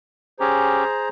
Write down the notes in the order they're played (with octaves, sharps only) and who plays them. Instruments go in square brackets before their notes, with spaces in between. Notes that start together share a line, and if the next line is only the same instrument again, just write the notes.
[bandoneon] C#4 G4 [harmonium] G#4 C5 A#5